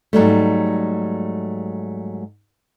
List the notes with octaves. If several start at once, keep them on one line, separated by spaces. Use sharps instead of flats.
G#2 F#3 G3 A3